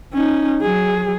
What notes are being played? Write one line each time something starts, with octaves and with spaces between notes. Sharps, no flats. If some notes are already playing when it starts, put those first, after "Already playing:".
C#4 D#4
F#3 G#4